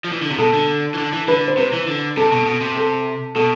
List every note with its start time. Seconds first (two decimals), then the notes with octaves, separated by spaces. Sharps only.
0.04 F3
0.13 E3
0.22 D3
0.30 C3
0.39 B2 A4
0.54 D3
0.94 E3
0.98 D3
1.13 E3
1.28 D3 B4
1.48 C5
1.57 C3 B4
1.73 E3
1.87 D3
2.17 C3 A4
2.32 B2
2.46 B2
2.61 C3
2.77 A4
3.35 B2 A4